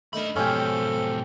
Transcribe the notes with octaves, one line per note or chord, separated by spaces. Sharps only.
A3 D4 D#4 A#4 B5
G#2 B2 F3 C#4 G4 A4 G5